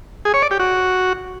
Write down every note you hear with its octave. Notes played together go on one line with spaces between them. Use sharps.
G#4
C#5
D5
G4
F#4